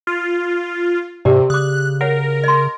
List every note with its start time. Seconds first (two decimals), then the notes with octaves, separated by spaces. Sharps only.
0.07 F4
1.25 G#2 C3 G4 A#4 D5
1.50 C#3 D6 D#6 F#6
2.01 A#4 C#5 F#5
2.44 D#5 C6